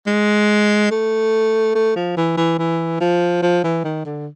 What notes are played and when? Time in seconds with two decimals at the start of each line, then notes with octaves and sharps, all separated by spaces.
0.07 G#3
0.91 A3
1.75 A3
1.96 F3
2.17 E3
2.37 E3
2.59 E3
3.00 F3
3.42 F3
3.64 E3
3.84 D#3
4.05 D3